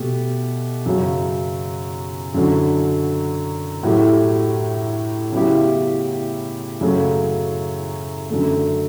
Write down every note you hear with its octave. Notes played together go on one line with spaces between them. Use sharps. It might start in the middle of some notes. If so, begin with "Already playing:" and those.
Already playing: B2 A3 G4
F#2 C#3 F#3
F#2 D3 F#3
A2 F#3 A3 E4 G4
C#3 F#3 B3 E4 G4
F#2 C#3 F#3 A3
F#2 D3 A3